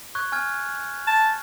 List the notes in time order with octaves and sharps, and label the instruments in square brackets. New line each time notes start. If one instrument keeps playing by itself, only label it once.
[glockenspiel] C#6 F#6 G#6
G#5 F6 G#6
[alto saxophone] A5